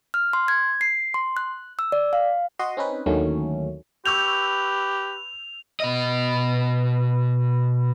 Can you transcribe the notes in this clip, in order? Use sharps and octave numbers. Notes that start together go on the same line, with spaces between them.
F6
C6
G#6
C7
C6
F#6
E6
D5
F5
F#4 D#5 C6
C4 C#4 D#4 B4
D#2 D3 D#3 F#3 A3 C#4
G4 B4 C#6 E6 G6 F7
B2 D#5